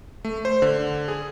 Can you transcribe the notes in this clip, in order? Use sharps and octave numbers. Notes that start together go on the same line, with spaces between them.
A3
C5
D3
G#4